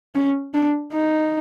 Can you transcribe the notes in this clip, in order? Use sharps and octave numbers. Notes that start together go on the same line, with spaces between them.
C#4
D4
D#4